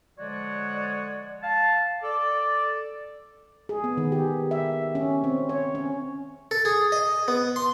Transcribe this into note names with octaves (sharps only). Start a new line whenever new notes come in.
D3 F3 G#3 F#4 C#5 D5
F5 A5
A4 D5
G#4
B3
D#3
G4
E5
C#4
C4
C#5
C#4
A4
G#4
D#5
B3
C6